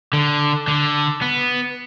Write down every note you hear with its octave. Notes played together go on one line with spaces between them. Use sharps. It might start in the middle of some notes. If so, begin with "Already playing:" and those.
D3
D3
B3